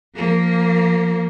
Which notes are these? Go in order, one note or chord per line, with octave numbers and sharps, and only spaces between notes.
F3 A#3